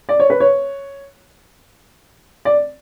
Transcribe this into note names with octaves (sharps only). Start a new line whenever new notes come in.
D5
C#5
B4
C#5
D5